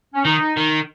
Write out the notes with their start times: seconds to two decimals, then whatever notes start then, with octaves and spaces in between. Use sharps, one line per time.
0.14 C#4
0.25 D#3 D#4
0.57 D#3